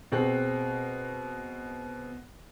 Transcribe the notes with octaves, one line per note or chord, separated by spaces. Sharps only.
B2 C4 G#4 F#6